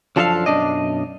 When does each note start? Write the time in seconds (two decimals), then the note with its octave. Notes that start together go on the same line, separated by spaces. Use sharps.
0.16 F#2 F3 D4 A4 D#5 F5
0.46 B1 F#2 F#3 D4 D5 D#5